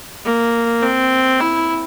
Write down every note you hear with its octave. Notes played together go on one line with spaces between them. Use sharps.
A#3
C4
E4